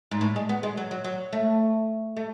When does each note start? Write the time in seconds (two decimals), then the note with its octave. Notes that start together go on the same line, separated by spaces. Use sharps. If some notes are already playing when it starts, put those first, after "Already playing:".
0.11 G#2
0.21 A2
0.36 G#3
0.49 B3
0.63 G#3
0.77 F#3
0.91 F#3
1.04 F#3
1.33 A3
2.17 A3